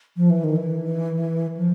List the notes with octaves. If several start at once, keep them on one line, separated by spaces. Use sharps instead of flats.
F3
E3
D#3
E3
F3